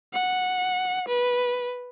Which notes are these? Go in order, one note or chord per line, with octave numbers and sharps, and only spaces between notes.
F#5
B4